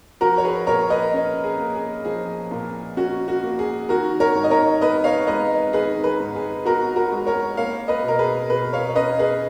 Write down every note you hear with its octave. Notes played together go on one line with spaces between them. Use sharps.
F3 F#4 A#4
C#5
G#4 B4
A#2 A#4 C#5
B4 D#5
C#4
G#4
A#3
G#4
F3 G#4
A#2
C#4 F#4
F#4
A#3
G#4
D#3 F#4 A#4
A#4 C#5
G#2
D#5
A#4 C#5
B3 B4 D#5
C#5 F5
G#3 B4 D#5
D#3 G#4 B4
G#4 B4
G#2
G#4
B3 F#4 A#4
F#4 A#4
G#3
A#4 C#5
A#3 C#5 F5
B4 D#5
B2 A#4
G#4 B4
B2 G#4 B4
C#5 F5
C#5
C#4 B4 D#5
G#4 B4